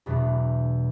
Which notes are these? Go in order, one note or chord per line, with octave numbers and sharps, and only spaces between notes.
E2 B2 F#3 A3 D4